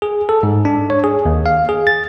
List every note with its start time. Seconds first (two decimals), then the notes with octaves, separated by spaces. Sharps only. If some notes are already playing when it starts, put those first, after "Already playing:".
0.02 G#4
0.29 A4
0.43 G#2
0.65 D4
0.90 C#5
1.04 G#4
1.25 D#2
1.46 F5
1.69 G#4
1.87 A6